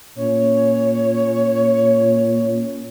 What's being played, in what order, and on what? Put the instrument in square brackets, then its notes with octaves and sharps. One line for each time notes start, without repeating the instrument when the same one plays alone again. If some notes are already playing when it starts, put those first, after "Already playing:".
[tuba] A#2 [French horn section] C#4 [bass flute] C#5